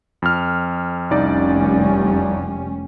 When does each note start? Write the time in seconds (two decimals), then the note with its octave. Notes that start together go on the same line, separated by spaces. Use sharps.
0.22 F2 F6
1.11 F1 C2 G3 C#4 D#4 D5